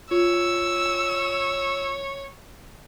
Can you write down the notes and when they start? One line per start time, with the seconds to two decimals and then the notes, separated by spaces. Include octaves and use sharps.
0.11 F4 C#5 E6